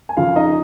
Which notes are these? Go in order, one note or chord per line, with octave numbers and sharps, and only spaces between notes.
G#5
F2 C#3 F3 F4 F5
D#4 D#5